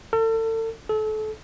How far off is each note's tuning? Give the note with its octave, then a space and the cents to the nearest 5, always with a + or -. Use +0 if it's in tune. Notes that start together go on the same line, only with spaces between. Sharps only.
A4 +40
A4 -30